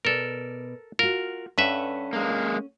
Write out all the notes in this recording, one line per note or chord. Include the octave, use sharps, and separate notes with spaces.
B2 A4 A#4 D5
F4 F#4 A#4
G2 C#4 A4 B4 E5 F#5
G#3 A#3